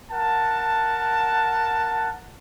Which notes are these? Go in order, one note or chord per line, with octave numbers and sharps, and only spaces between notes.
A#4 F#5 A5